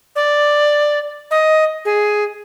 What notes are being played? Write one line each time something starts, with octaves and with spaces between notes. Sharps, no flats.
D5
D#5
G#4